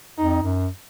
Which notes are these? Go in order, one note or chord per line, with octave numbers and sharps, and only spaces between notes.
F2 D#4
F#2